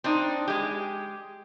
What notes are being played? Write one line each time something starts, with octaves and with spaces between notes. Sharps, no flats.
C4 D4 D#4
G#3 G4